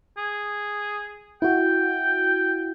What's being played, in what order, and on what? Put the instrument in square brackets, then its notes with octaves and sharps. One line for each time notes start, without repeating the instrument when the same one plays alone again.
[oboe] G#4
[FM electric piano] E4 F#4 [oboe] G5